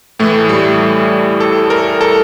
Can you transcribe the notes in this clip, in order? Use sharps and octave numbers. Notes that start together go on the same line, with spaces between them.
A2 E3 A3
G3
A4
A#4
A4